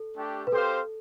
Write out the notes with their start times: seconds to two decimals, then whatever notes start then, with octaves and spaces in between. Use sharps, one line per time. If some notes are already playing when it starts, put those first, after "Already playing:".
Already playing: A4
0.16 A3 D4 G4
0.47 B4
0.51 C4 G4 A4 C5 F5